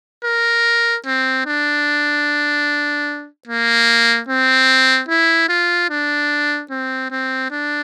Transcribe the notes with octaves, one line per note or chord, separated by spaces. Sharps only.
A#4
C4
D4
A#3
C4
E4
F4
D4
C4
C4
D4